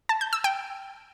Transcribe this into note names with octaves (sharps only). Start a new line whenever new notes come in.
A5
G6
E6
G5